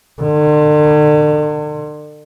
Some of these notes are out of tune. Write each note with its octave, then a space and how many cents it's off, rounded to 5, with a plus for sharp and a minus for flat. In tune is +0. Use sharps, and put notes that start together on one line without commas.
D3 +40